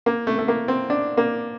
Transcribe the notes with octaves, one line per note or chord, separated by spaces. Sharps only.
A#3
A3
A3
A#3
C4
D4
A#3